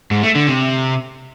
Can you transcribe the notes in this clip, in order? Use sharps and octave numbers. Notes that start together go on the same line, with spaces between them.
G#2
A3
D3
C3